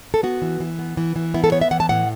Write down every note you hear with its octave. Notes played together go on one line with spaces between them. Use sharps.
A4
B3 F#4
E3
E3
B3
E3
E3
B3 E4
A4
B3 C#5
E5
E3 F#5
A5
A2 F#5